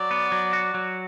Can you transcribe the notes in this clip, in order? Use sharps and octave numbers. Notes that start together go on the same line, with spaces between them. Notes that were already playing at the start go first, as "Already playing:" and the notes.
Already playing: F#3 D5
B3
F#3
F#4
F#3